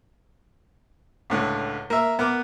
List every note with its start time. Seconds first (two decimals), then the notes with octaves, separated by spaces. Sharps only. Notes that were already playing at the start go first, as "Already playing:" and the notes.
1.30 C#2 A2 D3
1.90 A#3 E5
2.19 B3 A#4 D6